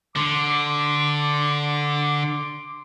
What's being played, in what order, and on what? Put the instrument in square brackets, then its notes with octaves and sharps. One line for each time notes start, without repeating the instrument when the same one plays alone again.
[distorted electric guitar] D3 [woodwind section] C6 D6